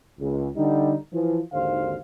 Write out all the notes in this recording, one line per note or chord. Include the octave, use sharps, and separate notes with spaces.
C#2
D3 G3 D#4
E3 F3
G#1 D#2 D3 C5 F5